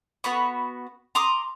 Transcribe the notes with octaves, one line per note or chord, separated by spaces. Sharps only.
B3 F#4 B5 C#6
A#5 C6 D6 D#6